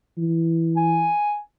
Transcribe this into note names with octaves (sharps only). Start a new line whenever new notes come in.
E3
G#5